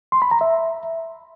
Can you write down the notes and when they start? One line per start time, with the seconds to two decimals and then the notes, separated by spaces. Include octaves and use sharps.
0.12 C6
0.22 B5
0.31 A#5
0.41 E5